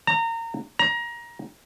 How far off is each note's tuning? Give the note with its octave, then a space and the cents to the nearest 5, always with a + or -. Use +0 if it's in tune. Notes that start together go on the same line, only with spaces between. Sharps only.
A#5 -25
A#5 +25